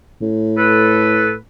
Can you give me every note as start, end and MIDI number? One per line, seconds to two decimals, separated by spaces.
0.21 1.38 45
0.56 1.32 69
0.56 1.32 71